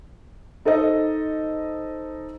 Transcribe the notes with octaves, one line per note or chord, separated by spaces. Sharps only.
D#4 A4 C5 D#5